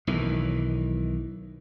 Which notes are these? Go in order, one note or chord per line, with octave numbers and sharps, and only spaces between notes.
B1 D#3 E3